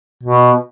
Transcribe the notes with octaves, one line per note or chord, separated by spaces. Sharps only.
B2